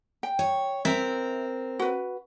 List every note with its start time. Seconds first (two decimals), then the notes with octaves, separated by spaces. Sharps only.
0.23 G5
0.39 C#5
0.85 C4 A#4 E5
1.79 F#4 B4